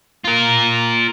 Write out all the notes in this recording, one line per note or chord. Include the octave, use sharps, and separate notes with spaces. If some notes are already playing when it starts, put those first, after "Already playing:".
F4 A#4